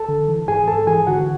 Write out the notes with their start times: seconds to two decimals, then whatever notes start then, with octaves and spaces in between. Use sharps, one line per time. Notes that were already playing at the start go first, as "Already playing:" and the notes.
Already playing: A4 A5
0.09 D3
0.28 E3
0.48 G#2 G#4 G#5
0.68 G#2 A4 A5
0.87 E3 G#4 G#5
1.07 D3 F#4 F#5